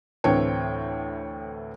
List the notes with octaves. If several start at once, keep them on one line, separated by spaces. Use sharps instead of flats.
D2 A2 E3 C4 C#5 G5